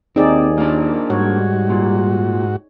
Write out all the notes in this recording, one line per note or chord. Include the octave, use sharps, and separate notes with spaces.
D#2 C4 D#4 G#4 D5
A#3 D4
G#2 G3 F#4 C#5
A#2